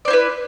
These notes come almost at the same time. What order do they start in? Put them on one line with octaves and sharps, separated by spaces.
D5 C5 E4 B4